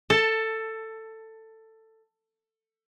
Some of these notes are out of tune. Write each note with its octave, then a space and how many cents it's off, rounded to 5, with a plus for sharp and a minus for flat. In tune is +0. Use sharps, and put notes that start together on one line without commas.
A4 +15 A5 +0